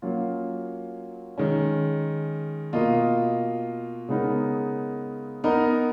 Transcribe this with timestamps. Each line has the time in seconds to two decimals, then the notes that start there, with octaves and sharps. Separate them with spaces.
0.02 F#3 A#3 C#4 F4
1.38 D#3 G#3 C#4
2.73 B2 A#3 F4 A#4 D#5
4.09 C#3 G#3 B3 D#4 A#4
5.44 B3 D#4 A#4 D#5